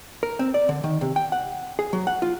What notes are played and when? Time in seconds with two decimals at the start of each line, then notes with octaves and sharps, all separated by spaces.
0.23 A#4
0.39 C4
0.54 D5
0.69 D3
0.84 D#3
1.01 C3
1.16 G5
1.32 F#5
1.79 G#4
1.93 F#3
2.07 F#5
2.22 F4